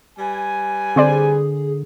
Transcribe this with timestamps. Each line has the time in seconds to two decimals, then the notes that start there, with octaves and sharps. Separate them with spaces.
0.19 G3 B4 G#5
0.96 D3 C4 G#4 C5 D5